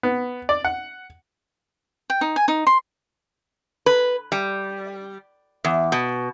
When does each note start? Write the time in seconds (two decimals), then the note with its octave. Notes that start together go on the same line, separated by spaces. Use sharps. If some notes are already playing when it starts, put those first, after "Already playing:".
0.03 B3
0.49 D5
0.65 F#5
2.10 G5
2.21 D#4
2.36 G#5
2.48 D#4
2.67 C6
3.86 B4
4.32 G3
5.64 E2
5.92 B2